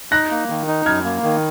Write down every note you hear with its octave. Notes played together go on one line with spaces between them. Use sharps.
D#4 F#6 A#6
A#3
D#3
D#4
F#2 F6 G#6
A#3
D#3